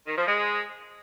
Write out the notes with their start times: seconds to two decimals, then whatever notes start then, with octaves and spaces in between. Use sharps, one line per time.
0.06 D#3
0.17 F3
0.27 G#3